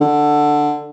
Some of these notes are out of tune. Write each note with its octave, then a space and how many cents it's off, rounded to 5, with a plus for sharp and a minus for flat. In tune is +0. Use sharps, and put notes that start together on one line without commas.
D3 +10